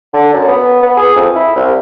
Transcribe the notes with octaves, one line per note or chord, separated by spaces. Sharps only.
D3
F#2
B3
B3
G#4
F2
E4
C2